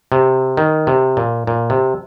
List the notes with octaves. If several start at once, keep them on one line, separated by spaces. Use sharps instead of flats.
C3
D#3
C3
A#2
A#2
C3